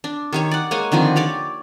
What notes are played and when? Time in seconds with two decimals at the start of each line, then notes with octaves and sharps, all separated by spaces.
0.04 D4
0.33 D#3 G4 C#5
0.51 D5 F#5
0.71 G#3 A#3 C#5 G#5
0.92 D3 D#3 F3 C4
1.16 G4 C#5 D5